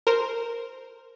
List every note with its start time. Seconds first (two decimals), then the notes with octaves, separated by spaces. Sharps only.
0.07 A#4 C5